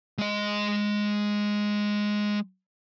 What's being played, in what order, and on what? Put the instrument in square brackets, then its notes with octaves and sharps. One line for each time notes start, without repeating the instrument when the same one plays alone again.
[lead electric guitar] G#3 D#5